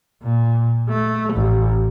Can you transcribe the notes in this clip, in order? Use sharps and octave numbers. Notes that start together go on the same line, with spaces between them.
A#2
A3
A1